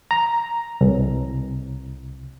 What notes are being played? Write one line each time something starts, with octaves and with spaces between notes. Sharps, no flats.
A#5
C2